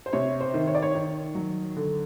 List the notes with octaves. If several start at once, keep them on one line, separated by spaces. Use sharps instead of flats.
C5
C3 C#5
C5
D#3
C#5
D5
C#5
D#3
F#3
D3